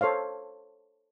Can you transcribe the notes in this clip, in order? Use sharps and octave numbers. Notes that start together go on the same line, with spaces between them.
A4 C5 C#5 F5